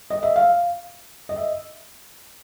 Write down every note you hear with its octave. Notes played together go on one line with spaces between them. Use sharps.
D#5
E5
F5
D#5
E5